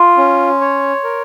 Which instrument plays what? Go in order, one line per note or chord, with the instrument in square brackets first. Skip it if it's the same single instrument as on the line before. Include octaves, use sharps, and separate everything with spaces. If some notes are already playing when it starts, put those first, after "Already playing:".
Already playing: [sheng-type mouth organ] F4 [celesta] C6
[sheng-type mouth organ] C#4
C#5
A#4